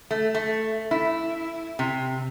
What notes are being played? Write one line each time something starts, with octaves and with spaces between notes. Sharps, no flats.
A3
A3
E4
C3